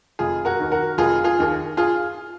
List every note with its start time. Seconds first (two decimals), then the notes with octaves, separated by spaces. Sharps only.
0.19 F1 F4 G#4
0.45 F#4 A#4
0.59 D#2 D#3
0.71 F#4 A#4
0.98 F1 F4 G#4
1.24 F4 G#4
1.38 D#2 D#3
1.77 F4 G#4